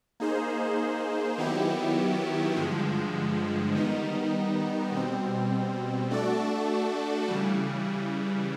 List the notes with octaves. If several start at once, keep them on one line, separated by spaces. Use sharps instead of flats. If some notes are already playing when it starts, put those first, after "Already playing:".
A#3 D#4 G#4 C5
D#3 F#3 B3 E4 G4
G2 D3 F3 G#3
D#3 G3 B3 D#4
B2 G3 C4
A3 D4 F#4 A4 D5
C#3 E3 G3